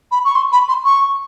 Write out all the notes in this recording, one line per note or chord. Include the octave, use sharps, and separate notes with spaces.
B5
C#6
C6
B5
C6
C#6